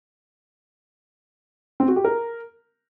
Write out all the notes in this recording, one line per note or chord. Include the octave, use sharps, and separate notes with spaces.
C4
F#4
G4
A#4